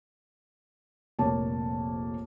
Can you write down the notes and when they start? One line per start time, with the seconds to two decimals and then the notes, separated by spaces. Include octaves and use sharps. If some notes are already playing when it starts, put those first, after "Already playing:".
1.18 F1 A#1 A#3 C#5 A5